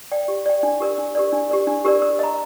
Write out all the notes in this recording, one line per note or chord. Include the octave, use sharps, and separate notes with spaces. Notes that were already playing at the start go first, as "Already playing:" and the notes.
D5 G5
G4
D5 G5
D4
G4 A#4 D5
D4
G4 A#4 D5
D4
G4 A#4 D5
D4
G4 A#4 D5
A#4
D#5 A#5